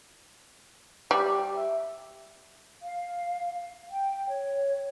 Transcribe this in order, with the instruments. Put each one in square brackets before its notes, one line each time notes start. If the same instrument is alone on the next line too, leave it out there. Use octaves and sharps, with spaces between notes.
[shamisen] G3 [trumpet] G4
[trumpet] E5
[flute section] F5
G5
C#5